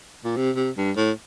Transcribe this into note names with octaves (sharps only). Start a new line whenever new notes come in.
A#2
C3
C3
G2
A2